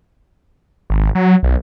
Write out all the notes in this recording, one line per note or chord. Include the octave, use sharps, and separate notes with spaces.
G#1
F#3
B1